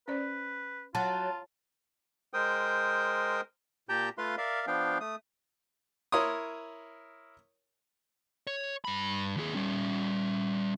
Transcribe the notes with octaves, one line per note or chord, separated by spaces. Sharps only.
C#4 B4 C5 D5
F#3 F4 A5 A6
G#3 A#4 C5 G5 D#6
A#2 G4 G5 A5 A#5 G6
A3 F4 B4 F5 C6
A#4 D5 E5 F5
F3 B3 D4 F5 G5
A3 D#6
E4 A#4 C#5 C6 D#6
C#5
G2 B5
D#2 G#4
G3 C#4